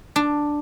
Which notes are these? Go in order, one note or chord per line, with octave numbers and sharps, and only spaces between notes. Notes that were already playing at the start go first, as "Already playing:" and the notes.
D4